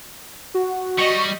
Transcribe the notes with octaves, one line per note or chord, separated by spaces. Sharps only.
F#4
G3 D#5 C#6